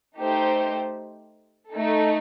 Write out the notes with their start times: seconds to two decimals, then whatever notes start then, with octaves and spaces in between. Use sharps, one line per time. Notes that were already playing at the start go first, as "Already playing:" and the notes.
0.18 A3 D#4 G4 C5
1.72 A3 D#4 A4